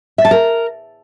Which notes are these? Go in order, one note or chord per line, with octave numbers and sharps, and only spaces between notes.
E5
A5
A#4